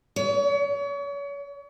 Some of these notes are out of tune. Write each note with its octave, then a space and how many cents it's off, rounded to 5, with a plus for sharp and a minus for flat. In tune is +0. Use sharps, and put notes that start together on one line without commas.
C#5 +35